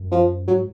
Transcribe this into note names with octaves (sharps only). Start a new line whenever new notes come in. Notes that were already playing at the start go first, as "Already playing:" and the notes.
Already playing: F#2
F3
G#2 F#3